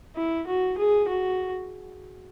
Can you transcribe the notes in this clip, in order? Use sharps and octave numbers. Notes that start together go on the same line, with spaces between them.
E4
F#4
G#4
F#4